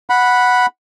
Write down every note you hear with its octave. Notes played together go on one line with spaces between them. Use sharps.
F#5 B5